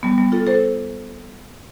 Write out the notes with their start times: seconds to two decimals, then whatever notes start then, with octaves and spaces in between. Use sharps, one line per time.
0.03 G3 B3
0.18 G3 B3
0.32 F4 A4
0.47 A4 C5